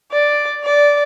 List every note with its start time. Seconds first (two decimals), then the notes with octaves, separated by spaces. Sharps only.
0.12 D5
0.65 D5